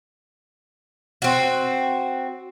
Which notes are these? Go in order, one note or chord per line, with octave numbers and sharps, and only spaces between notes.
C4 F#4